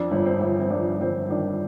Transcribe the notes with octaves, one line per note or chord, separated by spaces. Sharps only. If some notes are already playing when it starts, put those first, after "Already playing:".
Already playing: F2 D4
G1
C4
G1
C4
G1 D4
G1 C4
D#3 D4